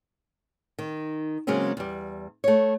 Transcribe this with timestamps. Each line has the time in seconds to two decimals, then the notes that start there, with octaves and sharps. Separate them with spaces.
0.79 D#3
1.47 C#3 F#3 G#3 A#3 C4 C#4
1.77 E2 G3
2.44 A3 C#5